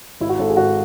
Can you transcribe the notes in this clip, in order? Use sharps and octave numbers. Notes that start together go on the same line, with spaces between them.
G#1 E4
F#4
G#1 A4
G#4
G#1 F#4